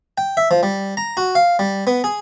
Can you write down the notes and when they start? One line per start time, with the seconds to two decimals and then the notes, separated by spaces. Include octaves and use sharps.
0.18 G5
0.37 E5
0.51 F3
0.63 G3
0.97 A#5
1.17 F#4
1.35 F5
1.59 G3
1.87 B3
2.04 G#4